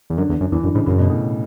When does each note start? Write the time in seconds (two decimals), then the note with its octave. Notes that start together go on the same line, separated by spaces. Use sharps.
0.10 E2
0.18 F#2 D3
0.30 E2
0.41 F#2
0.52 E2 E3
0.63 F#2 D3
0.75 G#2 C#3
0.86 F#2 C#3
0.98 B2
1.10 A2